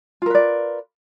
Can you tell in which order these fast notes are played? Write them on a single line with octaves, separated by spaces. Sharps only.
F4 A#4 B4 D5